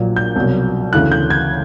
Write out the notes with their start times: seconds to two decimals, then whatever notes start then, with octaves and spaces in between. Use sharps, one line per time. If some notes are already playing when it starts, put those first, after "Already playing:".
Already playing: A#1 A#2 F#3
0.16 G6
0.36 C2 B2 F#3
0.93 D2 C#3 E3 F#6
1.12 G6
1.30 G#6